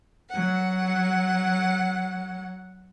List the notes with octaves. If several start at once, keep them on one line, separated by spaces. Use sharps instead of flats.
F#3 F#5